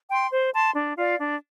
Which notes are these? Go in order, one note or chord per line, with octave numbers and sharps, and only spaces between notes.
G5 C6
C5
A5 C6
D4
F4 D5 F5
D4